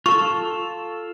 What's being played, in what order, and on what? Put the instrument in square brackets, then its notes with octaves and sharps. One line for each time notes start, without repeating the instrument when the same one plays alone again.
[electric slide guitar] F4 A4 [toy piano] C#6